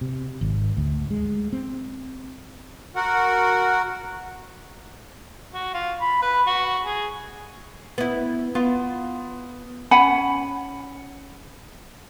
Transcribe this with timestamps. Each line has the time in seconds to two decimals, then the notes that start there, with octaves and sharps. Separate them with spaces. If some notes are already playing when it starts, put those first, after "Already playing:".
0.01 C3
0.41 G#1
0.77 D2
1.11 G#3
1.53 C4
2.96 F#4 A#4 F#5
5.53 F#4
5.74 F4
6.01 B5
6.22 B4
6.47 F#4
6.85 G#4
7.98 B3 E4
8.55 B3 F4
9.91 C#4 F#5 G#5 B5